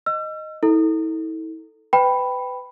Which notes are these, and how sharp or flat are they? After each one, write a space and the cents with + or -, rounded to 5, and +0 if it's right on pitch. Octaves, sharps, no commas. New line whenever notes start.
D#5 +0 E6 +40
E4 -45 A4 +0
B4 +25 G5 +0 B5 +0